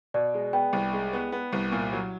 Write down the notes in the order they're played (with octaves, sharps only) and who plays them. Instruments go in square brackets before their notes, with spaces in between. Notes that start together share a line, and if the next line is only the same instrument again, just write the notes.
[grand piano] B2 [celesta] D5
[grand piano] G#3
[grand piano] B3 [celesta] G5
[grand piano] C2
G#3
B3
B3
C2
A#2
F#3